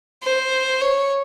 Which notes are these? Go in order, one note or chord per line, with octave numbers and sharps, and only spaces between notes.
C5
C#5